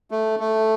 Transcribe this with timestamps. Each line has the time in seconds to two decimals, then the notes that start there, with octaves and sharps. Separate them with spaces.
0.11 A3
0.39 A3